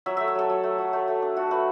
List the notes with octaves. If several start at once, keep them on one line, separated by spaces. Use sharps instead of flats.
F#3 E5
A3 E5
E5
F#3 A4
F#3
A3
F#3
A3
A3
D4
A3 F#4
A3 B4